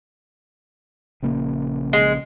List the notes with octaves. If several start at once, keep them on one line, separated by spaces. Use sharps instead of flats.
A#1 C#3 A#3
G#3